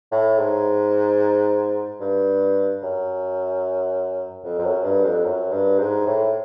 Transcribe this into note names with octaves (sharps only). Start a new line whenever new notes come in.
A2
G#2
G2
F#2
F2
F2
F#2
G2
F2
F#2
G2
G#2
A2